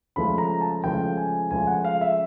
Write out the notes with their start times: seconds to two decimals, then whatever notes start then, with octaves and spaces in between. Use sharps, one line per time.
0.16 C#2 C#3 F3 A3 B5
0.38 A#5
0.61 A5
0.83 C#2 C#3 F3 A3 G5
1.17 G#5
1.51 C#2 C#3 F3 A3 G#5
1.67 F#5
1.85 F5
2.01 E5